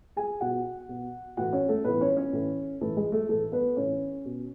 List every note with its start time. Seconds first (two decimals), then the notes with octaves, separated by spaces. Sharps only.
0.16 G#4 G#5
0.41 B2 F#4 F#5
0.89 B2
1.37 A2 E3 F#4 F#5
1.53 C#4 C#5
1.69 A3 A4
1.84 A2 E3 B3 B4
2.01 C#4 C#5
2.16 C#4 C#5
2.33 A2 E3
2.81 A2 E3 A3 A4
2.96 G#3 G#4
3.12 A3 A4
3.29 A2 E3 A3 A4
3.52 B3 B4
3.76 A2 E3 C#4 C#5
4.25 B2